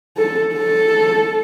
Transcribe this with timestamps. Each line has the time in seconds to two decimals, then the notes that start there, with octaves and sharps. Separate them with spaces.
0.17 A4
0.53 A4